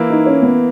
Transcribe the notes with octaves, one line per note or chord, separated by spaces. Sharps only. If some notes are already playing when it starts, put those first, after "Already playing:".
Already playing: E3 A#3 E4
D#4
C#4
B3